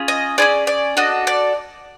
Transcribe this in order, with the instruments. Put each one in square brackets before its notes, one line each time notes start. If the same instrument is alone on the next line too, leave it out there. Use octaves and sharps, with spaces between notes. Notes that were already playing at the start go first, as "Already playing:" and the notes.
Already playing: [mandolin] C#4 F4 G#4
D#5
C#4 F4 G#4 D5
D5
D4 F#4 A4 D#5
D5